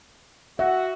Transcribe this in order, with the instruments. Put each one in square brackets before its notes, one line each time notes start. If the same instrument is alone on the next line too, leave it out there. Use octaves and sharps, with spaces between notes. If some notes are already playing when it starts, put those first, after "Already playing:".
[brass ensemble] F#4 [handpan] E5